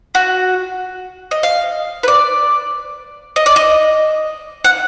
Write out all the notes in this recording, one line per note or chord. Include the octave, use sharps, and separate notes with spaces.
F#4
D#5
F5
B4
D5
D#5
D5
D#5
F#5